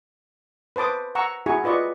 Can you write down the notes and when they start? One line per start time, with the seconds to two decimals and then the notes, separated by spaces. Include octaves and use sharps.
0.76 B4 C5 A5 D6 D#6
1.15 F#5 A#5 C#6 E6
1.46 E4 F#4 G#4 G#5 C#6
1.64 F4 B4 D5 D#5 C#6